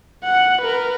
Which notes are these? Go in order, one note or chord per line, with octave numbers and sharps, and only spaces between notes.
F#5
A#4 B4